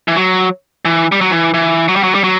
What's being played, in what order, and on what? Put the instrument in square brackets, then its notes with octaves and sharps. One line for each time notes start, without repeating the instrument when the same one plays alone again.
[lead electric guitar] E3
F#3
E3
G3
F#3
E3
E3
F#3
G3
F#3
G3
F#3